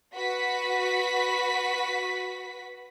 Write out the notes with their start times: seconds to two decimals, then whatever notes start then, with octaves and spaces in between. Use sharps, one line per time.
0.14 F#4 B4 B6